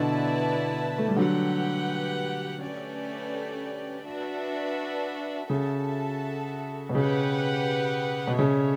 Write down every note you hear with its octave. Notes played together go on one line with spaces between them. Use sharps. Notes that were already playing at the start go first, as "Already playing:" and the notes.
Already playing: B2 D3 B3 E4 B4 D5 A5
A3
G3
D3 F#3 G4 B4 F#5
A3 C#4 G4 B4 D5
D4 F#4 B4 E5
C#3 F#4 A4 E5 A5
B2
C#3 G4 B4 F#5
B2
C#3 D4 A4 C#5 E5